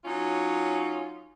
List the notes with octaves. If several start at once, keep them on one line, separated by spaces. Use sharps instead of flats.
F#3 C#4 D#4 F4